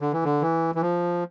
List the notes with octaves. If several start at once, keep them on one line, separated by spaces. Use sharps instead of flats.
D3
E3
D3
E3
E3
F3